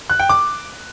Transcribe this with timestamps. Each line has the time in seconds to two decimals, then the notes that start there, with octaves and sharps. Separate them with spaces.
0.10 F#6
0.20 G5
0.29 D6